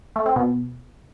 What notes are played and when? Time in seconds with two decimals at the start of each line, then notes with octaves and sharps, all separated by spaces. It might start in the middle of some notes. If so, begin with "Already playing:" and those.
0.16 A3
0.26 C4
0.36 B2